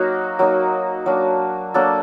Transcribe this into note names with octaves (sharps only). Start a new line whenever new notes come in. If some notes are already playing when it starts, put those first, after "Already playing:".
Already playing: F#3 A#3 D#4 F#4
F#3 A#3 D#4
F#3 A#3 D4
F#3 A#3 D4 A4